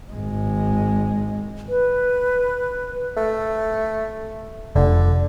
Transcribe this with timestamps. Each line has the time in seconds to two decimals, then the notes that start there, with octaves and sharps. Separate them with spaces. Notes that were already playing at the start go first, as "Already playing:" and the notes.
0.11 G#1 G#3
1.68 B4
3.17 A3
4.76 F1 D3